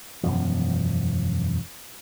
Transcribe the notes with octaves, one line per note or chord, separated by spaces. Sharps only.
E1 F#2 F3